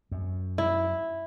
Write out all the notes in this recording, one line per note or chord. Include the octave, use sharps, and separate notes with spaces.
F#2
E4